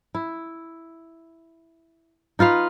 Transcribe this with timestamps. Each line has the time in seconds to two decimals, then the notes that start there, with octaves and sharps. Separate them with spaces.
0.15 E4
2.39 D#4 F4 B4 F5